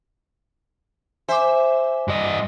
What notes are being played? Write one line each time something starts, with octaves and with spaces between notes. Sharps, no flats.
C5 E5 G#5 D6
G2 D#5